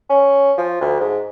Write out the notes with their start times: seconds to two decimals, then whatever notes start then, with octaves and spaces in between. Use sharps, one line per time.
0.10 C#4
0.58 F3
0.81 D2
1.00 G#2